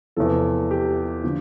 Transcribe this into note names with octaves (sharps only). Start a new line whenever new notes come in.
E2 C3 F3 A4
G4
D3 F3